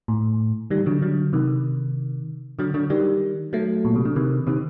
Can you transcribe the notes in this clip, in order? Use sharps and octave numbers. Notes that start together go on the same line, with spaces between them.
A2
D#3 G3
D3 F#3
D3 F#3
C3 D#3
D3 F#3
D3 F#3
D#3 G3
F#3 A3
A#2
C3
D3
C3 D#3
C3 D#3